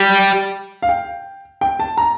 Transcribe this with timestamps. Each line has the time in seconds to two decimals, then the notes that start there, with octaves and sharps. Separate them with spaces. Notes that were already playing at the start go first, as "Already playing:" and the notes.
Already playing: G3
0.82 F5
0.89 G5
1.61 G5
1.79 A5
1.98 A#5